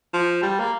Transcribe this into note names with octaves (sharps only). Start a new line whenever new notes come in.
F3
G3
A#3